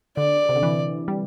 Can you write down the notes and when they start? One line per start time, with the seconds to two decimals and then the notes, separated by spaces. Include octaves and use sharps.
0.17 D3 D5
0.49 C3
0.56 D3
0.63 E3
1.08 G3